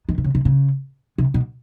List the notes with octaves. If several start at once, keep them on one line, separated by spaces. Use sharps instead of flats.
D#3
C3
C#3
C3
C#3
C3
B2